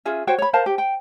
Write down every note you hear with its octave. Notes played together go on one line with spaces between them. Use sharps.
C#4 F4 G#4 E5
F#4 C5 C#5 G5
C#5 B5
A#4 C5 F5 A5
G4
G5